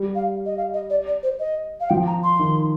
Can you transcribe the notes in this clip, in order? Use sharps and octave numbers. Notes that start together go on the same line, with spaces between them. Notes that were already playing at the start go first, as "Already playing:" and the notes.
Already playing: G3
F5
D#5
F5
D#5
D5
D5
C5
D#5
F5
F3 G5
A#5
C6
D#3